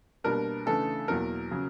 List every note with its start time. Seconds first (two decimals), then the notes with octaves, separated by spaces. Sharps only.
0.24 B2 G3 A#3 D4 A#4
0.66 C#3 E3 A3 D4 A4
1.08 E2 B2 F#3 A#3 A#4
1.51 C#3 F#3